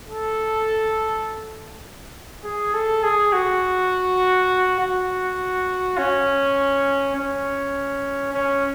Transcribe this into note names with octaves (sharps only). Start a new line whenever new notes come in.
A4
G#4
A4
G#4
F#4
F#4
C#4
C#4
C#4